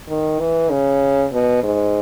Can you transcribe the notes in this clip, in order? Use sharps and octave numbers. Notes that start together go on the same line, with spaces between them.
D#3
E3
C#3
B2
G#2